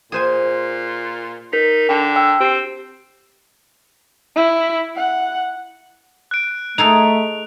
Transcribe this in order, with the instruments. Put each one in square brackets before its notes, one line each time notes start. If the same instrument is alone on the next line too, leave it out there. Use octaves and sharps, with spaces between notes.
[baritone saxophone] A#2 [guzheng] G#4 C5 G#5
[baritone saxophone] D#4 [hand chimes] A#4 B6
[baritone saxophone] D3 [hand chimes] G5
[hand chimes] G5 E6
[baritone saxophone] C4 [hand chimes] G4 C7
[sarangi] E4
F#5
[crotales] F#6 D7
[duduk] A3 [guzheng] D#4 G#4 A4 [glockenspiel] F7